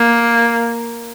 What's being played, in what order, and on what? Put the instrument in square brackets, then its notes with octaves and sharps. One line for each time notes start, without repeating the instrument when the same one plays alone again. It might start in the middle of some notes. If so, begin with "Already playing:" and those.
Already playing: [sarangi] A#3